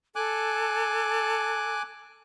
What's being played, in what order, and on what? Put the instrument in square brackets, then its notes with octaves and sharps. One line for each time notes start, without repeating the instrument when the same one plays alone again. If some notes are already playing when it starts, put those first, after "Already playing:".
[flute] A4 [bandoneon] G#5 D6 F#6